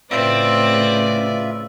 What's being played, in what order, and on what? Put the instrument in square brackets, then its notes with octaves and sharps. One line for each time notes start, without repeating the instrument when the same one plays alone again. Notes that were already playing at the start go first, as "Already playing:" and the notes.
[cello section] A2 C#3 [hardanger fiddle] C4 [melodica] F4 E5 [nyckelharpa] B4 D5